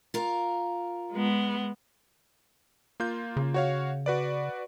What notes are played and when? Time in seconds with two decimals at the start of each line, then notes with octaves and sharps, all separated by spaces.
0.14 F4 A#4
1.12 G#3 B3
3.00 A#3 F4 G6
3.37 C#3
3.54 F#4 C#5 F5
4.06 F#4 B4 D5